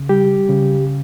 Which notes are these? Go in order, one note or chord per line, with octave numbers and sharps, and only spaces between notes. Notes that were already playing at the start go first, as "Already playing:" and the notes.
Already playing: C#3
G3 G4
C#3